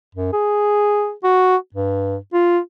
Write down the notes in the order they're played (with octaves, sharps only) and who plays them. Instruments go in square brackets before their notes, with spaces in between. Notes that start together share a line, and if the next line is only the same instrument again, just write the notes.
[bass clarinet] F#2
G#4
F#4
G2
F4